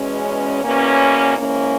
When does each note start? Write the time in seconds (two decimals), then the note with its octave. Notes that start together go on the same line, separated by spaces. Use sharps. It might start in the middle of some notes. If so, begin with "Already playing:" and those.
Already playing: E2 B2 G#3 C#4
0.64 E2 B2 A#3 C#4
1.38 G#2 E3 A#3 C#4